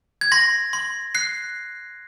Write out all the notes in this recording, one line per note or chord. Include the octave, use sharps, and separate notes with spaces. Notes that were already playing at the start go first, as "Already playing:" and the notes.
G#6
C6 A#6
C6
F#6 C7